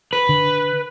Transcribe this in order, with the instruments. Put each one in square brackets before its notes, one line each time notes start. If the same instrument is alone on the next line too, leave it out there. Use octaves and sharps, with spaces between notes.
[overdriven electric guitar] B4
[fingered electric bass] D3